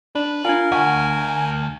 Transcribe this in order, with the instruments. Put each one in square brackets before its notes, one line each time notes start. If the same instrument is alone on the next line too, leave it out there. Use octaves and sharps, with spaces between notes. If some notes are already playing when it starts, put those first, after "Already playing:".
[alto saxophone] D4 [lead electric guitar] B4
[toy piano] D4 G#5 [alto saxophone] F4 [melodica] A#4
[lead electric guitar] D2 [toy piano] F5 F#5 C#6 [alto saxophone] G#5